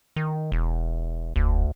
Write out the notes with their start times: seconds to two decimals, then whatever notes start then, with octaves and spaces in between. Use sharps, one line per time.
0.16 D#3
0.52 E1
1.36 E1 D2